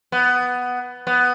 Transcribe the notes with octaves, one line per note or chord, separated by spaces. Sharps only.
B3
B3